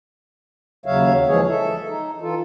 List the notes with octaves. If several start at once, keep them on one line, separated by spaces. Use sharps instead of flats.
D#2 C#3 F#3 C#5 E5 F5
E3 F3 G#3 G#4 C#5
A4 E5
D#4
E3 F4 A4